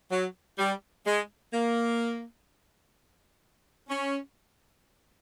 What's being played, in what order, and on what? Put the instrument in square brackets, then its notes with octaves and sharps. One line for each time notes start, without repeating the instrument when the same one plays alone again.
[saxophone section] F#3
G3
G#3
A#3
C#4